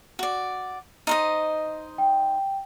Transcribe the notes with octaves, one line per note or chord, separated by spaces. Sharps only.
F#4 D5
D#4 C5 D#5
G5